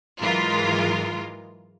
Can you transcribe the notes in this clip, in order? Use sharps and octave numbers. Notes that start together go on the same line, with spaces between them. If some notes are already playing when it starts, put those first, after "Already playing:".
G#2 E3 F#3 G#3 F4 A#4